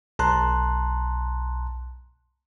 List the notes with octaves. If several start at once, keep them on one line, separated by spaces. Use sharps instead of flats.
B1 A5 A#5 C6 F#6